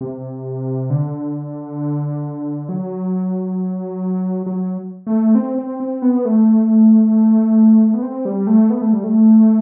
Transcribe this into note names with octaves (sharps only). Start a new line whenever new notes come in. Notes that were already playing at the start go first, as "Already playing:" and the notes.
C3
D3
F#3
F#3
A3
C4
C4
C4
B3
A3
B3
C4
G3
A3
B3
A3
G3
A3